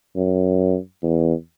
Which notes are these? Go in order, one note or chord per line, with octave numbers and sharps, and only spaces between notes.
F#2
E2